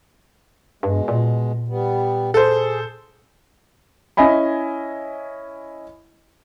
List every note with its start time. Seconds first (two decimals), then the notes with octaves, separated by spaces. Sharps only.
0.83 G2 B2 G#3
1.08 A#2
1.68 G3 B3
2.34 G#4 A4 C5
4.17 C#4 E4 D#5 G#5 B5